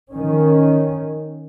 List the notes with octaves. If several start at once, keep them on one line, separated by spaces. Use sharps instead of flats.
D#3 C#4